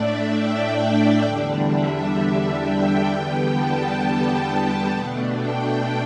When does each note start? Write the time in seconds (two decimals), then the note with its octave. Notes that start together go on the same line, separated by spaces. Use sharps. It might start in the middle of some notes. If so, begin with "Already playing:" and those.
Already playing: A2 A3 D4 D5 E5
0.31 G5
1.22 E2 D3 G3 D4
1.69 E5
2.60 G5
3.07 E2 D3 G3 B3
3.53 A5
3.98 A5
4.91 B2 A3 D4
5.37 G5